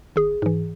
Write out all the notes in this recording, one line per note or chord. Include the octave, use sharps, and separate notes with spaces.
G#1 G#4
G#2 E3